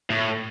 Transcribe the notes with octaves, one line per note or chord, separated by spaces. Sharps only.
A2